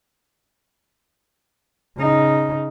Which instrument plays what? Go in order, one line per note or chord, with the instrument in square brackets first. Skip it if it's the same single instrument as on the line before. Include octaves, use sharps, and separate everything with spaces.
[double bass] C#3 D#4